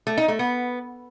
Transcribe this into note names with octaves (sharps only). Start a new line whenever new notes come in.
A3
D#4
A3
B3